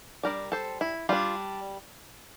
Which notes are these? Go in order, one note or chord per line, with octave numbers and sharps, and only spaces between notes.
G3 D4 A#4 D5
A4 C5
E4
G3 D4 F4